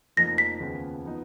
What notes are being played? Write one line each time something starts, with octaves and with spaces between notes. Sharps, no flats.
F1 F2 F3 A#3 D#4 A#6
B6
D#2 C#3 F3 B3
F3 B3 D#4